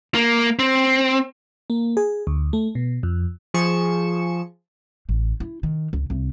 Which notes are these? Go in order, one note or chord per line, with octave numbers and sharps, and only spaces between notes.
A#3
C4
A#3
G#4
D2
A3
B2
F2
F3 G#4 C#6 C#7 E7
A1
E4
D#3
C#2
C2